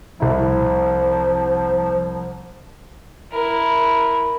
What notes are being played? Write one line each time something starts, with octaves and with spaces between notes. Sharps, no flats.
C2 F3 E4
E4 A#4